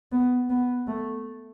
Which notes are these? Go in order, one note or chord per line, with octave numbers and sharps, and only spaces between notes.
B3
B3
A3